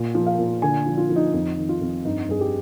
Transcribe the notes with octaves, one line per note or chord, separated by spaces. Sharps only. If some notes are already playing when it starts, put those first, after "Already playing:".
Already playing: A#2
F3
F5
A#2
D3 G#5
F3
F4
F3
D#4
F2 D#4
D#3
F4
F2
G2 D#4
G2 G#4
G4